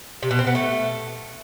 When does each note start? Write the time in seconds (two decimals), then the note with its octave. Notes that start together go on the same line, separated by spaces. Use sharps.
0.23 C3
0.31 B2
0.39 C4
0.47 B3
0.55 A3